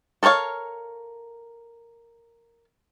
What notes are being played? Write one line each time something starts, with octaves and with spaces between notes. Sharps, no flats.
A4 A#4 C5 C#5 F5